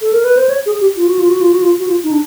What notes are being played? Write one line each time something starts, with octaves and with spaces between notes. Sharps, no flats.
A4
A#4
B4
C5
C#5
G#4
G4
F4
F#4
F4
F#4
F4
F#4
F4
F#4
F4
D#4
D4